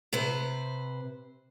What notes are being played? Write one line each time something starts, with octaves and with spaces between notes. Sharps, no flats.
C3 B4 C5